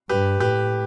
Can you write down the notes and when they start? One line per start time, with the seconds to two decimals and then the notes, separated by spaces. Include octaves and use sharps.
0.09 G2 G4 B4
0.40 A2 G4 B4